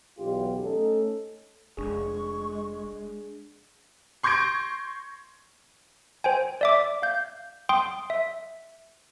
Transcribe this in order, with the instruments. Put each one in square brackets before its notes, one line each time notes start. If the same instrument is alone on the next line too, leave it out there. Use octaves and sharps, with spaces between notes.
[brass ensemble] B1 E2 F4 G4
A3 C#4 D#4 A4
[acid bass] F1 [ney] G#3 [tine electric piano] D4 G#4 [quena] C#6
[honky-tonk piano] C6 C#6 G6 G#6 A#6 D7
[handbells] C5 G5 G#5
D5 E5 D6
F5 G6
G5 C6 D#6
E5